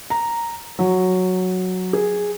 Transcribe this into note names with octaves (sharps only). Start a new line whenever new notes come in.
A#5
F#3
G#4